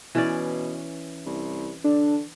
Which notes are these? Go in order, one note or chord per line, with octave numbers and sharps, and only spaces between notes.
B2 E3 C#4 D5
C2
D3 D4